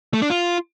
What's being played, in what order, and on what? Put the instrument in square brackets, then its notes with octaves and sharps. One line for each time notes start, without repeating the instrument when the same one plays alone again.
[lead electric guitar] A3
D4
F4